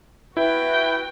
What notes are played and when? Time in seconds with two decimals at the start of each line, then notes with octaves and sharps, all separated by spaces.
0.37 E4 F#4 B4 G5